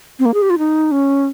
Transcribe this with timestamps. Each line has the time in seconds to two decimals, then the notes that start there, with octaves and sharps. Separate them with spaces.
0.19 C4
0.25 A#3
0.34 G#4
0.42 G4
0.50 F4
0.58 D#4
0.92 C#4